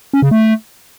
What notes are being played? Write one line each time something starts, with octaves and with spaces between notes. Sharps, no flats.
C#4
C#3
A3